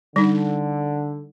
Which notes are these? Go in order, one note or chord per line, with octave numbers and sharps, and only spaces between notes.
D3 G3 D#4